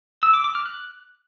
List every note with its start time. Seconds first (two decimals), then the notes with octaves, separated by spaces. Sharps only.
0.23 E6
0.34 D6
0.44 D6
0.55 F6
0.66 F#6